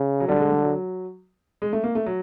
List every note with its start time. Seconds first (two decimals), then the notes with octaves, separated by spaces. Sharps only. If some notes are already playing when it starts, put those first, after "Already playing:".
Already playing: C#3
0.20 F#3
0.28 D3 G3
0.39 G#3
0.50 G3
0.62 F#3
0.73 F#3
1.62 G#3
1.73 A3
1.84 A#3
1.95 A3
2.06 F#3